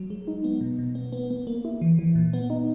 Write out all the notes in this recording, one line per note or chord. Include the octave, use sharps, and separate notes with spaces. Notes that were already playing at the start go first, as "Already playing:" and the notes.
Already playing: F#3
G#3
D#4
B3
B2
B2
B3
B3
B3
A#3
E4
E3
E3
A#2
B3
D#4